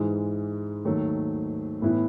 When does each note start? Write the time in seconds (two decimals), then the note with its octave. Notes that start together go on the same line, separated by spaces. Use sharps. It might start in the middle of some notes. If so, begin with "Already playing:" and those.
Already playing: G#2 E3 G#3
0.85 D#2 D#3 F#3 A3
1.82 A2 E3 B3 E4